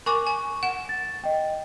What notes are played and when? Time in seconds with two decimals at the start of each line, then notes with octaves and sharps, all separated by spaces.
0.06 A#4 G#5 C#6 D6
0.26 G#5
0.63 F#5 E7
0.89 A6
1.24 D#5 G5